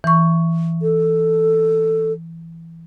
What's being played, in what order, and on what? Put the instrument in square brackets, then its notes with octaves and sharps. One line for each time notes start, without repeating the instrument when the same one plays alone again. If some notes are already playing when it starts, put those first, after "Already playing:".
[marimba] E3 C#6
[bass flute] A4